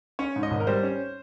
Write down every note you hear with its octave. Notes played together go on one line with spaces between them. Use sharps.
C#4 C#5
G#2
D#5
G#1
A#4
G3 C5
C#4